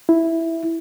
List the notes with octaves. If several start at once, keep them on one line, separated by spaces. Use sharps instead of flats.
E4